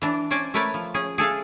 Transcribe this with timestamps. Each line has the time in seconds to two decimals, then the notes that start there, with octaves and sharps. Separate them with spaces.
0.02 E3 D4
0.31 C#4 C5 D5 G#5
0.54 A3 A#4 B4 C#5 D5
0.74 F3
0.94 C#4 G#4
1.18 G#4 A4 E5 F5